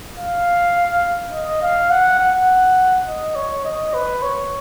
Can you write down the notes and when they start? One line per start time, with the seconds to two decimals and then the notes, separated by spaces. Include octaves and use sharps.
0.18 F5
1.33 D#5
1.62 F5
1.91 F#5
2.20 F#5
3.07 D#5
3.35 C#5
3.65 D#5
3.94 B4
4.22 C#5